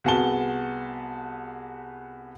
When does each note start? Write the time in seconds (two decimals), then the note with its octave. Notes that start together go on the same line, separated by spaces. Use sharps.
0.04 C2 B3 F#4 G#4 A5 G7